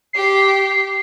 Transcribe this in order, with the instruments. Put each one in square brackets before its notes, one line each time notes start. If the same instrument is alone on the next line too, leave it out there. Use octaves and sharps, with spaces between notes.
[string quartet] G4 [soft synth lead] C7